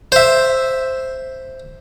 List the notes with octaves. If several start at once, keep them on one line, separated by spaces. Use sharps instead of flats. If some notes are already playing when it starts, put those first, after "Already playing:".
C5 E5